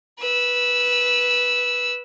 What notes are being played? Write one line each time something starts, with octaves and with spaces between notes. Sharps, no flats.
B4 E6